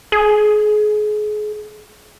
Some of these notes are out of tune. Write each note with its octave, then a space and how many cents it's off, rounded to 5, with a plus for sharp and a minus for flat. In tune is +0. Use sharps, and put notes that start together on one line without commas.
G#4 +30